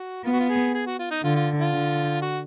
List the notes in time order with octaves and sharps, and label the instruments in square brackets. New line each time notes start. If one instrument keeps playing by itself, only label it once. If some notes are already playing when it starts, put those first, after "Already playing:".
Already playing: [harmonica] F#4
[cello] B3 [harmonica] F4
[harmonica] F#4
F4
G#4
G#4
F#4
F4
D#4
[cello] D3 [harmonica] F4
[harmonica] F4
F4
[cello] D3
[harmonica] F#4